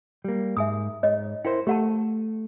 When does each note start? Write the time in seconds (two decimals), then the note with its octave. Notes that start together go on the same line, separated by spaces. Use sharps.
0.24 G3 A#3
0.57 G#2 E5 G#5 D#6
1.03 G#2 C#5 D#5
1.45 E4 A#4 C5 G5
1.67 A3 G4 A4 F#5 A5